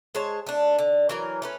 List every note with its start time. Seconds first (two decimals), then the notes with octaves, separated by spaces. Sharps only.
0.15 G#3 C5 C#5 A5
0.47 A3 D4
0.78 D3
1.09 E3 F#3 A#4
1.42 A3 C#4 B4